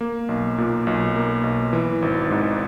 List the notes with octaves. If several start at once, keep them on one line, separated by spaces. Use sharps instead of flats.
A#3
B1
A#2
B1
A#3
B1
E3
G#1
G#2